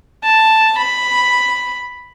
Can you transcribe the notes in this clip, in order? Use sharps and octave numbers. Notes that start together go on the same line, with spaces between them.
A5
B5